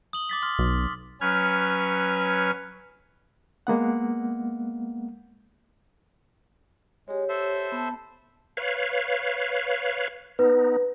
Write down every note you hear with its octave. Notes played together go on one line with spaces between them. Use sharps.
D#6 F#7 G7
D6 A6 B6
C6 F6
B1
F#3 C#4 B4 F6 G#6
G#3 A#3 B3 F#5
G#3 G4 C#5
A4 C5 E5
B3 A5
B4 C#5 F5
B3 D#4 B4